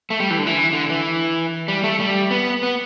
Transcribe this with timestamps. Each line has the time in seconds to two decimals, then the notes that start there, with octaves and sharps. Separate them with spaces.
0.10 A3
0.20 G3
0.31 E3
0.39 D3
0.47 E3
0.73 D3
0.90 E3
1.68 G3
1.84 A3
2.00 G3
2.31 B3
2.63 B3